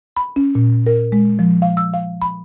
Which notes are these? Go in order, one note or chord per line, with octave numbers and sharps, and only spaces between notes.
B5
C#4
A#2
A#4
G#3
F3
F5
E6
F5
B5